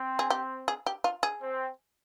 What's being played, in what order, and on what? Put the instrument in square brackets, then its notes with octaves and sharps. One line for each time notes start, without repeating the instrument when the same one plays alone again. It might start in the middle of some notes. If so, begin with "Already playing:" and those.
Already playing: [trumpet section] C4
[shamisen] G#4
G4
G#4
G4
F4
G#4
[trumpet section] C4